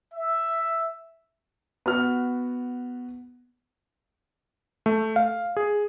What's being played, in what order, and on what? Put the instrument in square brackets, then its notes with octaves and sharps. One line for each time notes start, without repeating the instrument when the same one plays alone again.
[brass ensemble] E5
[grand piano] B3 F#4 F6
[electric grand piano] A3
F5
G#4